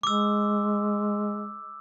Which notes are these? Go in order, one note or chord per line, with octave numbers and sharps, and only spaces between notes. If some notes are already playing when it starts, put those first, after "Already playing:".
G#3 D6 E6